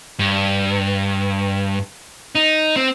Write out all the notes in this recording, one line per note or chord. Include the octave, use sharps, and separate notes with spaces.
G2
D#4
C4